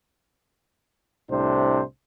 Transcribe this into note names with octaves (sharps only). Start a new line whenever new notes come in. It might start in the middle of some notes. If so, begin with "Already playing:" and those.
C2 A2 C3 D4 C5